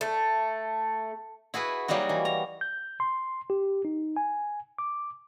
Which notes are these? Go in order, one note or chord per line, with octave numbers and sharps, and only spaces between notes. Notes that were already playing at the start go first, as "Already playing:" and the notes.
A3
E4 F#4 G#4 B4
F#3 G3 A#3 D#4 F#4
E3
A#5
G6
C6
G4
D#4
G#5
D6